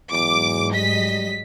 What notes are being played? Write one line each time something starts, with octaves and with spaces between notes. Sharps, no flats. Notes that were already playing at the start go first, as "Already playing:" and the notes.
E2 G#2 F#3 G#3 D6
G3 D#5 B6